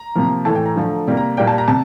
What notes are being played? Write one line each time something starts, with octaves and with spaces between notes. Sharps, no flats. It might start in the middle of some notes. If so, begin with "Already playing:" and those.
Already playing: A#5
C3 F3 A#3
A2 E3 A3 A5
G5
A#5
D3 F3 A3
C3 G3 A#3
A#5
A#2 G3 A#3 G5
A5
A#5
C3 A5